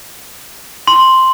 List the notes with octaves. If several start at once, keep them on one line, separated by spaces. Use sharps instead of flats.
C6